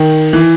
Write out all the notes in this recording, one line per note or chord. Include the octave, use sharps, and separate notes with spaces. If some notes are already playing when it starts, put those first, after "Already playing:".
Already playing: D#3
E3